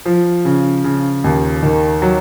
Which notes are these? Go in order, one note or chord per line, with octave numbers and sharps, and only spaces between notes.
F3
C#3
C#3
D#2
D#3
F#3